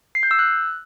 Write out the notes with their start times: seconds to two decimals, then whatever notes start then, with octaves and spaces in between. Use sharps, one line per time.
0.15 C7
0.23 G6
0.31 E6
0.39 F#6